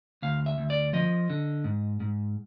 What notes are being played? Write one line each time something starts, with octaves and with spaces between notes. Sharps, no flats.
D2 F5
E5
D2
D5
F3 D#5
D3
G#2
G#2